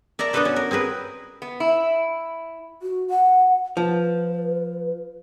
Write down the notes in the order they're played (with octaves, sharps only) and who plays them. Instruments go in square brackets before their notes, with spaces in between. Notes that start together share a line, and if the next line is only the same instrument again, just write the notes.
[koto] A#4 D5 E5 A5 A#5
B3 D4 F#4 A4 B4 C5
C#4
A#4
C4 G#4 A#4 B4
[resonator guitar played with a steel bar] B3
E4
[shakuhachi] F#4
F#5
[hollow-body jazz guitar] F3 [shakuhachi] B4